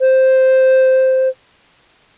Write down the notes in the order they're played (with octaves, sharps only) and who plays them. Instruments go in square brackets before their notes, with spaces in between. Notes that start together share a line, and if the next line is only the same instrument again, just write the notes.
[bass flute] C5